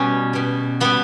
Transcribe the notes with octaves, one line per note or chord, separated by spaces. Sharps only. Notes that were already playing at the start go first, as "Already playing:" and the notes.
Already playing: B2 G3 C#4
B2 G3
B2 G3 B3